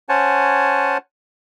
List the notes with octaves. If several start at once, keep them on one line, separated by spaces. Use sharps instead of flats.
C#4 C5 C#5 F#5 G#5 A5